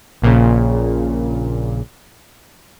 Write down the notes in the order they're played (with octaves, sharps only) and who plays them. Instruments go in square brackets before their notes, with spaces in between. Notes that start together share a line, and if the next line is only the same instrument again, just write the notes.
[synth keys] A#1 A#2 C#3